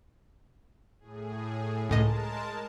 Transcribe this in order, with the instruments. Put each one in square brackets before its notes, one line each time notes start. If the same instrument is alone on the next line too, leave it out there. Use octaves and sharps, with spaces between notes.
[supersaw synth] A2 G#4
[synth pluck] C#2 A2 D#5 [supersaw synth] G#3 A#4 A5